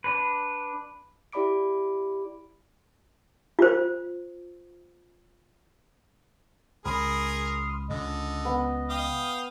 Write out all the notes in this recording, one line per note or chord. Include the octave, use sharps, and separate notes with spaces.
D4 B4
E4 G4 D5 B5 D6 D7
F4 C5
C#2 G#4 A#4 B5 C6 D#6 F6
C#2 D3 D#5
B3
F5 G5 D#6